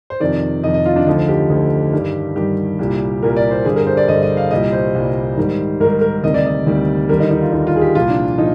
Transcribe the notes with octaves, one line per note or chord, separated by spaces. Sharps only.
C5
F2 C3 D#3 D5
F2 C3 D#3 D#5
D#5
F4
D4
D2 D3 F3 D#4
G4
D2 D3 F3
G2 D#3 G3
G2 D#3 G3 G4
C2 A#2 G3
C2 A#2 G3 A#4
D5
C5
G2 D3 G3 G#4
A#4
C5
D5
G2 D3 G3 D#5
D#5
F5
C2 A#2 G3 D#5
C5
C2 A#2 G3
G#2 D#3 G3
G#2 D#3 G3 A#4
A#4
D2 C3 D#3 G3 D#5
D5
D#5
D2 C3 D#3 G3
D#2 D3 G3 A#4
D#4
D#4
F4
D#2 D3 G3 D#4
F4
G#4
G4
C2 A#2 F3 F4
D4
A#2 F3 D#4